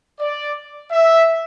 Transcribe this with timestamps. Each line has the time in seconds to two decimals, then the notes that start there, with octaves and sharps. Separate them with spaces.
0.20 D5
0.91 E5